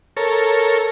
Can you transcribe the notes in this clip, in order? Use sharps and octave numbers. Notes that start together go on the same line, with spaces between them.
A4 A#4 C#5